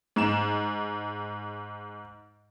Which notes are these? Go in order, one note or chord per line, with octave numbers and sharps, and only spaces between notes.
G#2 E7